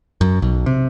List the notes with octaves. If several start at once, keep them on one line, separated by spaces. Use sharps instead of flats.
F#2
B1
C3